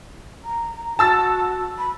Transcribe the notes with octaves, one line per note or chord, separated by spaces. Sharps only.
A#5
F#4 A5 E6 A6
B5